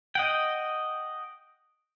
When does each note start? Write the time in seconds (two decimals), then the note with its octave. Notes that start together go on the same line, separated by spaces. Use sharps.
0.15 D#5 F#5 G5